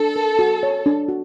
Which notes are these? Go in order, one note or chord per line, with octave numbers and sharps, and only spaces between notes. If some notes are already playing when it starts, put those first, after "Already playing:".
Already playing: D4 A4
A#4
F#4
C#5
D4
F#4